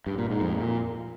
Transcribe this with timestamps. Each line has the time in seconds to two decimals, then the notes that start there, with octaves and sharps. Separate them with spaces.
0.06 G2
0.18 A#2
0.30 G#2
0.41 F2
0.53 A#2